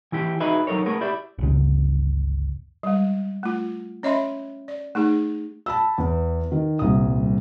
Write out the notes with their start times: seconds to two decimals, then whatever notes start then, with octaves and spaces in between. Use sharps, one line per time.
0.12 E3 E4 G4
0.40 D#4 F#4 G#4 B4 D#5 E5
0.67 F#3 D#4 A4 A#4 C#5
0.86 A3 B3 G#4 A#4
1.01 E4 G4 D5 E5
1.39 G1 C#2 C#3
2.83 G3 G#3
3.43 A3 F4
4.03 C#4 C#5 D#5 E5 B5 C6
4.68 D5
4.95 A3 D#4 G#4
5.66 A5 B5 E6
5.98 E2
6.52 D#3
6.79 D#1 C2 D#6